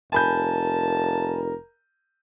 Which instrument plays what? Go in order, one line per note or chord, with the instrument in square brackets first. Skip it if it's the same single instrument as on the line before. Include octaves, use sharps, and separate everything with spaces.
[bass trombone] F1 [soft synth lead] A#4 [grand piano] G#5 B5 G6 [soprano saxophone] A5